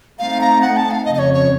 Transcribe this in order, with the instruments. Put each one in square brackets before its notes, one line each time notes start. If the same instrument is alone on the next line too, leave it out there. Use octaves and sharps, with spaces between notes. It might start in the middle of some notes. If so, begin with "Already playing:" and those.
[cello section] A3 C4 D#4 [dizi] F5
[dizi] A#5
F#5
A5
F5
[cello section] F2 C#3 F3 [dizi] D#5
[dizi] D#5
C#5
C#5